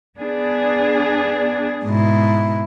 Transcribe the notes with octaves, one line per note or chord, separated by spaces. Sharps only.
B3 D4 G#4
G#2 B2 E4